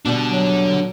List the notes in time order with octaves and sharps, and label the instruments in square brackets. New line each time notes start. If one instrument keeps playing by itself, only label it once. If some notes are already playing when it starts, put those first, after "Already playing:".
[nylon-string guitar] B2 G3 [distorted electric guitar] D4 A4
[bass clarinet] F#3